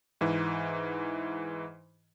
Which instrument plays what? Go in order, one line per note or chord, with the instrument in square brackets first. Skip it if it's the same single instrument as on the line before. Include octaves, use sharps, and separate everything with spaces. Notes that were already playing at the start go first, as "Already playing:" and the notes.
[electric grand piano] G#2 E3